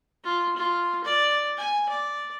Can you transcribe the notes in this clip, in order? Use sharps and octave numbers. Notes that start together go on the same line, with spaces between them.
F4
F4
D5
G#5
D5